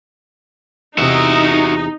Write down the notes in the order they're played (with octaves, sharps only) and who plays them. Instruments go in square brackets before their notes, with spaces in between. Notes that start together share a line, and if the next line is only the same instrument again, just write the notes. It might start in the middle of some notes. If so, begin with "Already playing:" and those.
[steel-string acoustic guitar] E2 C3 [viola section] D#4 [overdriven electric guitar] F#4 E5